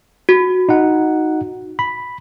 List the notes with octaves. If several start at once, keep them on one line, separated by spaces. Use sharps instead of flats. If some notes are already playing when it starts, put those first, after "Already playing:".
F#4
D#4 F#5
B5